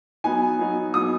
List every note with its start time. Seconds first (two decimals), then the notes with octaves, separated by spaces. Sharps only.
0.24 F#3 B3 D#4 G#5
0.59 F#3 B3 D#4
0.94 F#3 B3 D#4 D#6